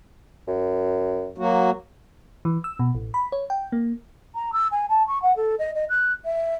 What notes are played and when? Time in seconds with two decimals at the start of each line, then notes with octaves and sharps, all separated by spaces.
0.47 F#2
1.38 F#3 A#3 F#4
2.45 E3
2.64 E6
2.79 B2
2.95 A1
3.14 B5
3.32 C#5
3.50 G5
3.72 A#3
4.35 A#5
4.52 E6
4.71 G#5
4.89 A5
5.07 C#6
5.22 F#5
5.36 A4
5.59 D#5
5.75 D#5
5.89 F#6
6.25 E5